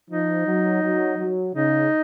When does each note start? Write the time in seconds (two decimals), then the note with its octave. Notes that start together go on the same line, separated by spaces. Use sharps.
0.10 F3 D#4
0.46 F#3
0.82 F#3
1.19 F#3
1.55 C#3 D#4